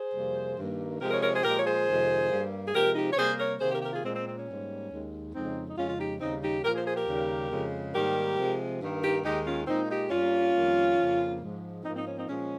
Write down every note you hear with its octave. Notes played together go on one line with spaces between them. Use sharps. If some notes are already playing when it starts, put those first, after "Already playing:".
Already playing: G#4 C5
F2 C3 G3 A#3
G2 D#3 A#3
C3 F3 G#3 G4 A#4
A#4 C#5
A#4 C#5
G#4 C5
A#2 F3 G#3 G4 A#4
C#5
G#4 C5
F2 C3 D#3 G#3
G2 G3 A#3
G#4
C3 F3 G#3 G4 A#4
D#4 G4
C#5
C3 G3 A#3 G#4 C5
A#4 C#5
C3 D#3 A#3 G#4 C5
G4 A#4
G4 A#4
F4 G#4
A#2 G#3 C4
C4
C4
C#4
G#2 G3 A#3
D#2 D#3 G#3
F2 C#3 G#3 C4 D#4
D#4
F2 C#3 G#3 C#4 F4
F4
D#4 G4
D#2 C#3 G3 C4 D#4
D#4 G4
A#2 F3 A#3 G4 A#4
G#4 C5
G#4 C5
G4 A#4
D#2 C#3 G3 A#3
F2 C#3 G#3
G#2 D#3 G3 A#3 G4 A#4
C3 F3 G#3
G2 D#3 A#3
D#4 G4
D#2 D#3 G#3 D#4 G4
C#4 F4
A#2 G#3 C4 D#4
D#4 G4
G2 G3 A#3 C#4 F4
F2 D#3 G3 A#3
F2 C#3 F3 A#3
G#2 F3 G#3
G#2 F3 A#3 C4 D#4
C4 D#4
C#4
C4 D#4
A#2 F3 G#3 C#4